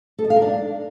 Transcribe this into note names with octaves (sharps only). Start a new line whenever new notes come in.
A4
D#5
F5
A#4
D4